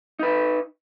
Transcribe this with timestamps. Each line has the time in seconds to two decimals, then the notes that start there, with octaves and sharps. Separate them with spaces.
0.19 D#4 B4